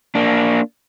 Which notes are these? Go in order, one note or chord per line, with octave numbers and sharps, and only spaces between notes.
A#3 D4